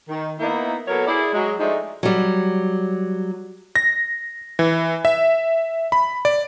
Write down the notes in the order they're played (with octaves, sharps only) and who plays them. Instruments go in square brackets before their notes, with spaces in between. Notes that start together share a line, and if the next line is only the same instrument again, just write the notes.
[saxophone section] D#3
A#3 B3 D#4 E4
F#3 A#3 B3 A4 A#4 C#5
E4 G#4 D5
F#3 G#3
F3 G#3 A3 D4 D#4
[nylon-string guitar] F#3 G3
[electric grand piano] A#6
E3
E5
B5
D5